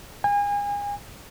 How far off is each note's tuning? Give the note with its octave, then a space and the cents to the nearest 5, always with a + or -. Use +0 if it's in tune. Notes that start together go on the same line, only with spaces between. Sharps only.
G#5 -35